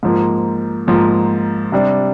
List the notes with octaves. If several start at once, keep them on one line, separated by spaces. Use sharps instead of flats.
G#2 F3 A#3
G#2 F3 A#3
C3 G3 D4